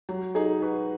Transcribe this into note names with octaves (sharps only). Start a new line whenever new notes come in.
F#3
D#4 G#4
F#4 B4